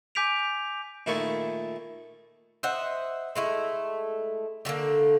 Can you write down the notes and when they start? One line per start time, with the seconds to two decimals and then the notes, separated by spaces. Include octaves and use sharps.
0.15 G#5 D6 G6 B6 D7 F7
1.06 A#2 D#3 A3 E4 C#6
2.63 C5 D#5 E5 F#5
3.36 G#3 A3 E4
4.65 D3 F#3 A3 A#3